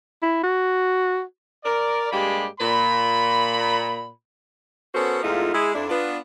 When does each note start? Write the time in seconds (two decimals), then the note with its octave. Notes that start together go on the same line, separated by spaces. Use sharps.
0.23 E4
0.44 F#4
1.64 A#4 D5
2.11 G2 G#3 A#3 G4 D5 B5
2.60 A#2 B5
4.95 B3 C#4 F#4 A4 A#4 C5
5.23 E2 G#2 A3 D#4 F4
5.53 G#3 E4 G#4
5.75 F2 D4 E4
5.90 B3 D4 F4